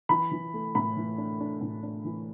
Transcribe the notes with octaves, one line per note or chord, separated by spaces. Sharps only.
E3 B5
E3
A3
A2 B5
E3
D4
D4
A2
D4
E3